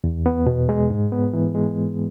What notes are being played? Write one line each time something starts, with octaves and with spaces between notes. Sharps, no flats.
E2
B3
B2
G#3
G#2
B3
E3
G#3